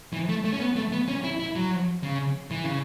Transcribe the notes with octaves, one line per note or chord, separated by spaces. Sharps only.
E3
A3
A3
C#4
B3
A3
B3
C#4
E4
E4
F#3
C#3
E3
C#3